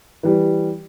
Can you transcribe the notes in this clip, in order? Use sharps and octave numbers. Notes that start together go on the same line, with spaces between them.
E3 G3